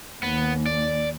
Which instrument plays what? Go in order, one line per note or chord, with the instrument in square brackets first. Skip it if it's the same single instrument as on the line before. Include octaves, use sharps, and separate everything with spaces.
[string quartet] D#2 [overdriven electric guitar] B3
[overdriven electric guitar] D5